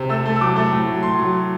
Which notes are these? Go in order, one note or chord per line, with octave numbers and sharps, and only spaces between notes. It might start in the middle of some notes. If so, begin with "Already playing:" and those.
Already playing: C3
A3 E6
A3
E6
F#3 D6
A3
A2
F#3
A2 C6
F#3